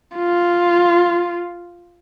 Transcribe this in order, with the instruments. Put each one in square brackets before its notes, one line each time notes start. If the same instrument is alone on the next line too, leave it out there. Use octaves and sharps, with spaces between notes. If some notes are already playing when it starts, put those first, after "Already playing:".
[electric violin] F4